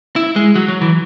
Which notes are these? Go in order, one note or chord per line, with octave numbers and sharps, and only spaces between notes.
E4
G#3
F#3
F#3
E3